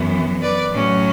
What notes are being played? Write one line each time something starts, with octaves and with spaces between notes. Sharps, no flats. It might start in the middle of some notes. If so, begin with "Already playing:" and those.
Already playing: F#2 E3 B3
B4 D5
A2 F#3 C#4